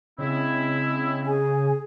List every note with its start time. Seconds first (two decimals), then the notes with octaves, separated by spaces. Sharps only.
0.19 C#3 G#3 C4 E4
1.26 G#4 G#5